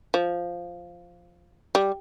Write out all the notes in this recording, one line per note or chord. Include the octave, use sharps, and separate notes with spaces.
F3
G3